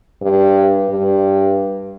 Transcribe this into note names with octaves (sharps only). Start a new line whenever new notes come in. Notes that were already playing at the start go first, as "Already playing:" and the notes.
G2
G2